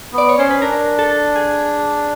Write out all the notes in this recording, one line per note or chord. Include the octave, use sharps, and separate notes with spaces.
B3
D5
C#5
C#4 C5
B4
D4 A#4
A4
G#4